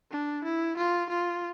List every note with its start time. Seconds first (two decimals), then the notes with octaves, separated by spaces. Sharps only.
0.11 D4
0.44 E4
0.77 F4
1.10 F4